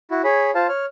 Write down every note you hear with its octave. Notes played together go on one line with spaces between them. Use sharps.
E4 F#4
G#4 C#5 B5
F4 C5 F5 A5
C#5 F6